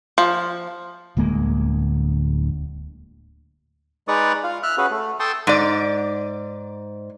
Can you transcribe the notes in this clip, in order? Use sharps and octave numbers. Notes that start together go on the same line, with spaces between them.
F3
D1 D2 G#3 A#3
G#3 D#4 B4 D5 C#6 D#6
F4 F5
E5 F6 F#6
C#4 F#4 G#4 B4
A3
A4 G5 A5 C6 C#6 D#6
G#2 D5